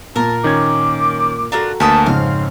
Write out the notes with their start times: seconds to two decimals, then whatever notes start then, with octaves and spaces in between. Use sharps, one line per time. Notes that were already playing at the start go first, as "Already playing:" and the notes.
0.16 A#2 A#3 A#4 A5
0.44 D#3 C#4 D6 G#6
1.52 D4 F4 F#4 A4 A#4 A#5
1.80 D2 A#3 B3 A5 B5 D#6
2.06 F2 G#2 C#3 C4 C#4 F5